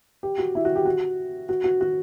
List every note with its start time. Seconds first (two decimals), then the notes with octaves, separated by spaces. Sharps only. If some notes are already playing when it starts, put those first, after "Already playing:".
0.23 G4
0.38 F#4
0.55 E4
0.65 F#4
0.76 G4
0.86 F#4
1.49 F#4
1.64 F#4
1.81 F#4